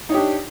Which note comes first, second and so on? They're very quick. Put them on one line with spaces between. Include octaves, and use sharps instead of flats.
D#4 C#5 G4 D4